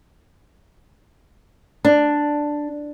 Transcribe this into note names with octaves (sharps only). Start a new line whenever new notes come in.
D4